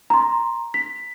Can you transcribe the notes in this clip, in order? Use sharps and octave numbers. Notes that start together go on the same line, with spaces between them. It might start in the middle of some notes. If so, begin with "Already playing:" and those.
A#5 C6
B6